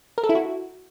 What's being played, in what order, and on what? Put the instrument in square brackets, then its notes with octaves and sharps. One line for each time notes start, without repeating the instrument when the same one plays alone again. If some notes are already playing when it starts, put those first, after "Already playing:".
[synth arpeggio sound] A#4
A4
E4
F#4